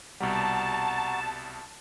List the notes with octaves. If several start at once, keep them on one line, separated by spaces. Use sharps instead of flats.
C2 B2 G3 F#5 A5 A#5 C#6